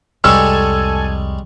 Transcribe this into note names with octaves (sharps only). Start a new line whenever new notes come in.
C2 F2 G3 G#3 A4 C#5 G#5 E6